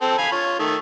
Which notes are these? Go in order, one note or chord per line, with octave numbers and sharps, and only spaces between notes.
C4 A4
F5 G#5 B5
F4 C#5
D#3 A3